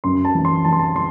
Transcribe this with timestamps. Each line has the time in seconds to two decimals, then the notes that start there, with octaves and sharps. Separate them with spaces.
0.04 F#2 C6
0.25 A5
0.35 E3
0.45 C6
0.65 E3 A5
0.73 C6
0.79 A5
0.96 E3 C6